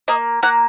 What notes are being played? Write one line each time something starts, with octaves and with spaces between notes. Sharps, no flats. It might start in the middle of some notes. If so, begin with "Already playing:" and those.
A#3 D#5
A#3 F#5